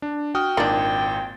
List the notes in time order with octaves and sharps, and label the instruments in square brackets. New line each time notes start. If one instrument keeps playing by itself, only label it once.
[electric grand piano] D4
[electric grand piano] F#4 D#6 F6 [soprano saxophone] G5
[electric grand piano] G#1 A#2 A6 [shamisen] D#3 D4